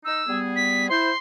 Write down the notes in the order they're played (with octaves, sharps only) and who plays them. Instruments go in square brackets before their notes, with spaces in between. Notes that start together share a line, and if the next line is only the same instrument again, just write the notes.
[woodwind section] D#4 [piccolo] E6
[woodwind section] G3 B3 G#4
[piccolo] B6
[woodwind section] E4 C5 [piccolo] C6